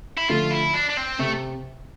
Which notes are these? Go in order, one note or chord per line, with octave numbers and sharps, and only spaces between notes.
E4
D3 F3 A3 F4
E4
D4
D4
C4
C3 A3